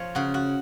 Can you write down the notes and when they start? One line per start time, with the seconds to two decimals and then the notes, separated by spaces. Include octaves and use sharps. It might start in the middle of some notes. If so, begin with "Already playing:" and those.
Already playing: F3 C#5
0.15 C#3 F#4
0.34 F#4